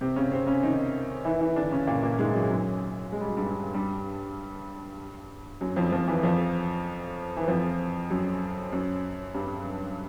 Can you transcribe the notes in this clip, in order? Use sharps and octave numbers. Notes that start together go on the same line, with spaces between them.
C3 C4
C#3 C#4
C3 C4
C#3 C#4
D#3 D#4
E3 E4
E3 E4
D3 D4
C#3 C#4
A#2 A#3
A#2 A#3
G#2 G#3
F#2 F#3
F#2 F#3
G#3
G3
F#3
G2 G3
G2 G3
F#2 F#3
F2 F3
F2 F3
E2 E3
F2 F3
E3
F2 F3
F#2 F#3
F#2 F#3
G2 G3